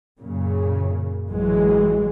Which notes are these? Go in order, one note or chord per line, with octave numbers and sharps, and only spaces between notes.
F#2 A#2 C#3
A1 A2 E3 F#3 G#3